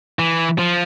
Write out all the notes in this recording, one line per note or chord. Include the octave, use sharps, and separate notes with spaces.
E3
F3